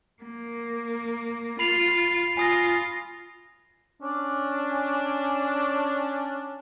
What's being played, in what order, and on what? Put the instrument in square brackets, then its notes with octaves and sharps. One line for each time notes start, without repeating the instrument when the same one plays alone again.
[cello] A#3
[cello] F4 [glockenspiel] B5 C7 F7
[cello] F4 [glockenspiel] G#5 D#6 A#6
[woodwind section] C#4 D4